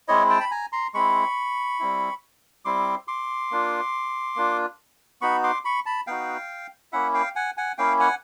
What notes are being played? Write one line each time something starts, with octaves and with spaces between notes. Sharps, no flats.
G#3 C4 E4 C#5 D#5
G5 A5
B5
G#5 A#5
A#5 C6
G#3 C4 E4 B5 C#6
G3 C4 E4
G3 C4 E4 C6 D6
C6 D6
A#3 D4 F4
A#3 D4 F4
B3 D#4 F#4 B5 C#6
C6 D6
B5 C#6
A5 B5
B3 D#4 F#4 F5 G5
A#3 C#4 E4 E5 F#5
F5 G5
F#5 G#5
F#5 G#5
A#3 C#4 E4 F5 G5
F#5 G#5